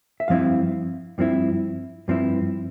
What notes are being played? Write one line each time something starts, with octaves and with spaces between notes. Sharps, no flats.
E5
G2 F3 C4 E4 F5
G2 F3 C4 E4
G2 F3 C4 E4